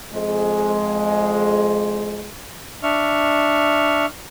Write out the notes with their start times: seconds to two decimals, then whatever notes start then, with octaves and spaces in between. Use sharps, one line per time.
0.13 F2 G#3
2.83 D4 E5 C#6 F6